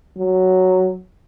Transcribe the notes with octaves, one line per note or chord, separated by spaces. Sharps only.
F#3